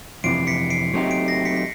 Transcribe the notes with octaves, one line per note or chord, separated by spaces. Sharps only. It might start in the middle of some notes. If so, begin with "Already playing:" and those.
F2 C3 E3 C7 D7
B6 C#7
C7 D7
F#3 A3 C4 D#4 G4
C7 D7
A#6 C7
B6 C#7
B6